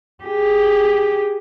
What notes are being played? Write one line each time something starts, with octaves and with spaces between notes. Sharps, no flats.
G4 G#4